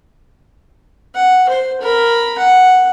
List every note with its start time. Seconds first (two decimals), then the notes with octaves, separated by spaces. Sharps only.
1.15 F#5
1.49 C5
1.81 A#4 B5
2.38 F#5